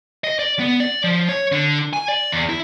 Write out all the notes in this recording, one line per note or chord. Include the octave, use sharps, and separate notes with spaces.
D#5
D5
B3
D5
F3
C#5
D3
G#5
D5
E2
E4